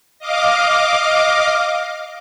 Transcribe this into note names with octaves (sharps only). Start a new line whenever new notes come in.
D#5 F5 D6